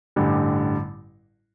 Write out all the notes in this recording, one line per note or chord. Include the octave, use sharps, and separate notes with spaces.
A1 G2 D3 G3